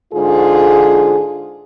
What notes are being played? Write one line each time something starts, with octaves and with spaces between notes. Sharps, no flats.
G#2 D3 F4 G#4